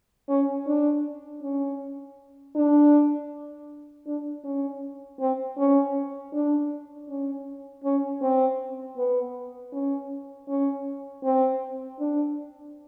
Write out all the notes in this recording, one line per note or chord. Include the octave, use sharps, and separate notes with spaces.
C#4
D4
C#4
D4
D4
C#4
C4
C#4
D4
C#4
C#4
C4
B3
C#4
C#4
C4
D4